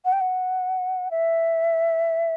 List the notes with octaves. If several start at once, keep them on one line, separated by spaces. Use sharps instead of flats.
F#5
G5
F#5
E5